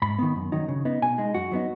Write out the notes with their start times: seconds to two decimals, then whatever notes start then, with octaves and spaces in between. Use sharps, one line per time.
0.02 G#2 B5
0.18 D#3 B3
0.36 F#2
0.52 D#3 F#3 D#4
0.68 C#3
0.85 B3 D#4
1.02 B2 G#5
1.18 G#3 D#4
1.34 F#2 F#4
1.52 F#3 B3 D#4